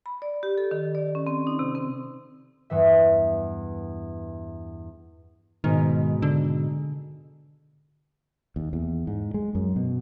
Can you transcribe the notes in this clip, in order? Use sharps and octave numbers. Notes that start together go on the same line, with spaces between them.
B5
D5
G4
A4
D#3
D5
C#4
C4
D#4
C3
C4
E2 G2 E3 E5
G#2 B2 D#3
D3
D#2
E2
G#2
G#3
F#2
B2